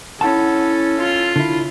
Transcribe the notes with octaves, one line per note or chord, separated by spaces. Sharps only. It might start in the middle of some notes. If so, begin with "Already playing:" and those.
C#4 E4 A4 F#5 A5
F4
D3 E4